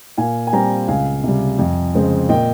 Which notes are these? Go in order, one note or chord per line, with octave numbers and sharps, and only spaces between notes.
A#2 F5 G#5
G#5
G3 C4 G5 A#5
C#2 F5 G#5
C3 G3
F2
C#3 G#3 C4
A#2 D#5 G5